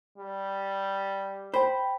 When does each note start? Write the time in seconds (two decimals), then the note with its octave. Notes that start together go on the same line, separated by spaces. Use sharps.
0.18 G3
1.54 C5 G5 B5